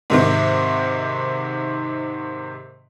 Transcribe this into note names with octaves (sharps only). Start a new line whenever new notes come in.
G#2 C3 D#3